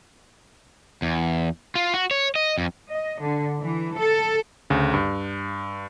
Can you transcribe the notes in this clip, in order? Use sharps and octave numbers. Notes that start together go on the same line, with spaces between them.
E2
F4
F#4
C#5
D#5
F2
D#5
D3
E3
A4
D2 C#3
G2